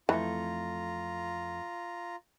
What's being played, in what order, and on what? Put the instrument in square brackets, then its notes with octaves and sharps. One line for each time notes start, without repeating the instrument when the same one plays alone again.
[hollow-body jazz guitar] F2 A3 [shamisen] E3 [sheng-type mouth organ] F4 A#5